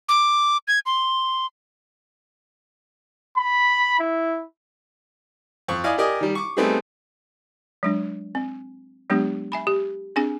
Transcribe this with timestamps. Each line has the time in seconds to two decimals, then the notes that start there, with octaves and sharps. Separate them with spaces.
0.09 D6
0.68 G#6
0.86 C6
3.38 B5
3.99 E4
5.68 F2 C#6
5.84 E4 D5 D#5 F5 G#5
5.98 G4 A#4 D5 D#5 G#5
6.20 D#3 G3
6.35 C#6 D6
6.57 G3 A3 B3 C4 D#4 G#4
7.83 F#3 G#3 D4
8.35 C4
9.10 F#3 G#3 B3 D4 G4
9.52 E5 G#5 B5
9.67 G4
10.16 C4 D4 G#4 G#5